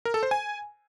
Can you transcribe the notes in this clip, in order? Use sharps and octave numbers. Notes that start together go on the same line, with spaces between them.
A#4
A4
C5
G#5